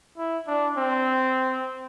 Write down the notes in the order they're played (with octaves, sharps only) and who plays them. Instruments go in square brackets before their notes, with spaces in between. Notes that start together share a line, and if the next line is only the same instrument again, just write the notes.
[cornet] E4
D4
C4